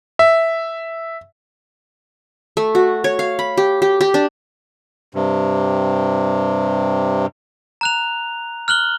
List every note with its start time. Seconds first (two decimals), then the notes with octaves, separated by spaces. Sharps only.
0.19 E5
2.57 A3
2.75 F#4
3.04 C#5
3.19 F5
3.39 B5
3.57 G4
3.82 G4
4.01 G4
4.14 D4
5.15 G2 C3
7.81 A#5 F#6 F7
8.68 F6 F#6 F#7 G7